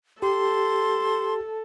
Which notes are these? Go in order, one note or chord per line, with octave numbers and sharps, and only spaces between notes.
G4 A4 C6